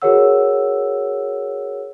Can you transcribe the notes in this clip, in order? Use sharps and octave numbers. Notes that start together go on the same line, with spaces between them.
F#4 G#4 A#4 C#5 F#5 E6